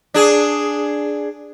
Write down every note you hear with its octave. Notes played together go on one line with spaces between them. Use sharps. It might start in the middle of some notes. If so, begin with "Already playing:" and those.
D4 G#4